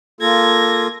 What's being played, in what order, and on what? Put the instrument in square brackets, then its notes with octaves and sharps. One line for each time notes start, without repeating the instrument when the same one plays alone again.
[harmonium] A#3 F4 A4 [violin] G#6 A#6